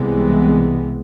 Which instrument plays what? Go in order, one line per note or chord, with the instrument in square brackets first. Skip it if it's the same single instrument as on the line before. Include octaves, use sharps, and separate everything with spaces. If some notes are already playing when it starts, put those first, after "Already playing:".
Already playing: [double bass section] C2 C3 E3 G#3 B3